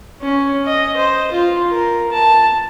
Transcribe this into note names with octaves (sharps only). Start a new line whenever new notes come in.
C#4
D#5
C5
F4
A#4
A5